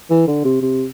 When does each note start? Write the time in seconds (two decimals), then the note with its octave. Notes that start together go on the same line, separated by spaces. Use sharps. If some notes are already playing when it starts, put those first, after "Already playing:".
0.10 E3
0.27 D3
0.45 C3
0.62 C3